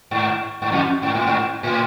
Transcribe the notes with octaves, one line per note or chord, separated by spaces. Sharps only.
G#2
G#2
F2
G#2
A2
G#2
A2